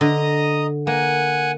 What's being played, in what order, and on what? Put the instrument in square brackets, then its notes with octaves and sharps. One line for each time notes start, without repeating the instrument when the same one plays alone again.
[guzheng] D3 [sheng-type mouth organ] D#5 A#5 D#6
[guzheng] A#3 [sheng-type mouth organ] F#5 G#5